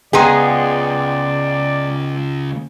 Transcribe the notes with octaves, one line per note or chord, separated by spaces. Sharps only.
C#2 G#3 B3 G#4 D5 G5 A#5 C6